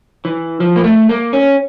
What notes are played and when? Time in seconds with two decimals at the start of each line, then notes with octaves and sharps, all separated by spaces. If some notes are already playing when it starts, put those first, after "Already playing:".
0.25 E3
0.60 F3
0.76 A#3
0.84 A3
1.09 A#3
1.33 C#4